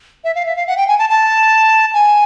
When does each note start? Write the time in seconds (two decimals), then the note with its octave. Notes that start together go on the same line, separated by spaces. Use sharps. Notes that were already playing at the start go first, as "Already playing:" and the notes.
0.24 E5
0.35 F5
0.46 E5
0.56 F5
0.67 F#5
0.77 G5
0.88 G#5
0.99 A5
1.10 A5
1.94 G#5